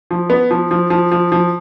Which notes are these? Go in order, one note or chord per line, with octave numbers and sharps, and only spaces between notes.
F3
B3
F3
F3
F3
F3
F3